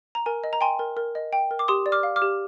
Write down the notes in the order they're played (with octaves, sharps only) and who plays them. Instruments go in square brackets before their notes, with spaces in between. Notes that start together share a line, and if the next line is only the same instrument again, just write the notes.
[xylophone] A#5
A#4 G#5
D#5
A#5
G5 G#5 C6
A#4
A#4
D#5
G5
A#4
D6
G4 C6 D#6
D5
D6 F6
F5
D6 F6
G4